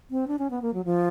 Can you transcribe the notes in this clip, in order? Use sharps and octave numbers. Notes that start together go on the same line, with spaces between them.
C4
D4
C#4
B3
A#3
F#3
F3